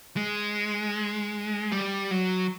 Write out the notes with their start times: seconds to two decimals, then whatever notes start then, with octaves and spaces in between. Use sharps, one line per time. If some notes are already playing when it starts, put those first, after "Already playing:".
0.16 G#3
1.72 G3
2.11 F#3